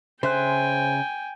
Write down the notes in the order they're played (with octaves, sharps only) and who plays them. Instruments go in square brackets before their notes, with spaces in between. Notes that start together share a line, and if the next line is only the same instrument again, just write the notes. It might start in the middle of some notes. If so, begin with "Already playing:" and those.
[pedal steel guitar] C#3 E5 F#6 [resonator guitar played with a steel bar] C5 [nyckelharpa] G5 G#5